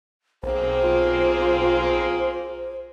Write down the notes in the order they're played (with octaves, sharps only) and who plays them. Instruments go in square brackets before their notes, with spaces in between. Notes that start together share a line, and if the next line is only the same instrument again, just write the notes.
[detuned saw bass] B1 [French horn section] A#3 C4 G#4 [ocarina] C5
[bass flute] F4